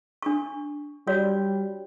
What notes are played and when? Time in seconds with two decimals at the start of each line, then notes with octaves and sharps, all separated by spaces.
0.22 D4 C#6
1.07 G3 F#4 C#5 D5